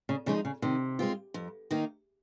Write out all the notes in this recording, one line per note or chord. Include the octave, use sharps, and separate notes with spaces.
C#3
C#3 F3 G#3 D#4
C#3
C3 D#3
G#3 C4 F4
F2
D#3 A#3 D#4